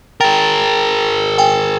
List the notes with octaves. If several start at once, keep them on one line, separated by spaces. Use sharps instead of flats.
G#4 A#4 G5 A6
G5 G#5